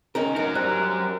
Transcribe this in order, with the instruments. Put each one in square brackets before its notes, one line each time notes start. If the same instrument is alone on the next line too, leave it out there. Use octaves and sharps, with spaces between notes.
[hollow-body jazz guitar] C#4 D#4 A#4
[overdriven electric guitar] F#3 A#4 [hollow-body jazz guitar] D#4
[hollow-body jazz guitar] G3 [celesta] C5 F#6